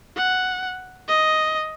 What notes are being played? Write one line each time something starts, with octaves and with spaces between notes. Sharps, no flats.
F#5
D#5